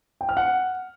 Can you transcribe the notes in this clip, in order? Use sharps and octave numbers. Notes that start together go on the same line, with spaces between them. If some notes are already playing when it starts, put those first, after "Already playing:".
G5
F6
F#5